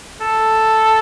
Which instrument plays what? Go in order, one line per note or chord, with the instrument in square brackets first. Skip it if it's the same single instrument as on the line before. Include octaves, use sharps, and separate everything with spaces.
[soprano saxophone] A4